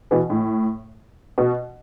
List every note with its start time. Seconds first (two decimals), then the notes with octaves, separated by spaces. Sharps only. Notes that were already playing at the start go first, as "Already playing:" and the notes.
0.11 B2 E3
0.30 A2
1.38 B2